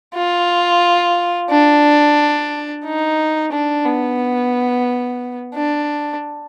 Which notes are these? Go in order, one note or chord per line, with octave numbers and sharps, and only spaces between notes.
F4
D4
D#4
D4
B3
D4